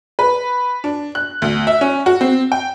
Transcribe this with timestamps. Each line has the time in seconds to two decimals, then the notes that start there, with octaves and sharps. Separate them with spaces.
0.19 B4
0.84 D4
1.15 F#6
1.42 D2
1.67 E5
1.81 C#4
2.06 F#4
2.21 C4
2.52 G5